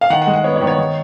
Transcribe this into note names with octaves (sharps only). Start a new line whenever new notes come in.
F5
D#3 F#5
F#5
G#3
F#5
B3 C#5
C#5
D#3
C#5
D#3